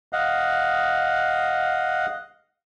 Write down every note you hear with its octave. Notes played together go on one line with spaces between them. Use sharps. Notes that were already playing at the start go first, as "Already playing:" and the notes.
D#5 F5 F#5